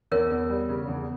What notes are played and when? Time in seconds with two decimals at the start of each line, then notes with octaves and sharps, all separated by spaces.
0.11 E2 A#4 C#5
0.31 E2
0.50 G3
0.69 C#3
0.88 E2